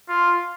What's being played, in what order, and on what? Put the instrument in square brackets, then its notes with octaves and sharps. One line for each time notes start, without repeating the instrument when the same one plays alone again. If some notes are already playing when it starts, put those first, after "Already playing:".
[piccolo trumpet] F4